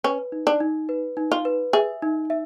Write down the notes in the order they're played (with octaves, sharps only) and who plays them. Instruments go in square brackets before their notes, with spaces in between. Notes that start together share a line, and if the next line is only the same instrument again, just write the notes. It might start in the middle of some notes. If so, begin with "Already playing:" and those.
[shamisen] C#4 [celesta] B4
[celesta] D#4
[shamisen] D4
[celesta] D#4
B4
D#4
[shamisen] F4
[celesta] B4
[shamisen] G#4 [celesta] E5
[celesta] D#4
E5